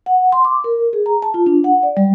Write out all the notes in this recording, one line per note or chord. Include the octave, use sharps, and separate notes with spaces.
F#5
C6
D6
A#4
G#4
A#5
A5
F4
D4
F#5
D5
G3